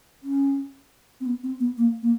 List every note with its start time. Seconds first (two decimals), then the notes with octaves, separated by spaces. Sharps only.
0.23 C#4
1.21 C4
1.26 B3
1.43 C4
1.60 B3
1.78 A#3
2.02 A#3